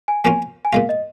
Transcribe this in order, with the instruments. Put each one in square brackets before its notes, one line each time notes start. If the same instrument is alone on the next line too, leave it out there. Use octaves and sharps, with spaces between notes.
[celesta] G#5
[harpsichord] F3 A#3 C#4 F4 [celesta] G#5
[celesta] G#5
[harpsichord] A#2 G#3 F4 [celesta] F5
[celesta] D#5